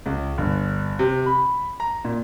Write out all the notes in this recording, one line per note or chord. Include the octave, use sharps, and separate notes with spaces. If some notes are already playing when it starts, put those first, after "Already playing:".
C#2
G1
C3
B5
A#5
A#2